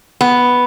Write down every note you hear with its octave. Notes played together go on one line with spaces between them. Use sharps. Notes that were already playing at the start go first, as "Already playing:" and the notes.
B3